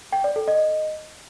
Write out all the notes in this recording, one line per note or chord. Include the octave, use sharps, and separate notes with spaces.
G5
D5
A4
D#5